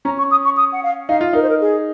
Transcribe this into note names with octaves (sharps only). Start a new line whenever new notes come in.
C#4 A#5
C#6
D#6
C#6
D#6
F#5
F5
D#4 F5
F4
D#4 A#4
C5
A#4
G#4